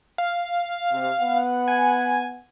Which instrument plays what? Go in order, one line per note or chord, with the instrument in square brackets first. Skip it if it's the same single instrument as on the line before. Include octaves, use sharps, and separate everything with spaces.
[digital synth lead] F5
[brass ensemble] C3
B3 F#5
[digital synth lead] G#5